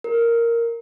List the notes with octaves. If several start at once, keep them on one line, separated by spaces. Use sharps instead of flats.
A#4